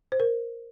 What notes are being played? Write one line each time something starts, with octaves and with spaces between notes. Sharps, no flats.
C5
A#4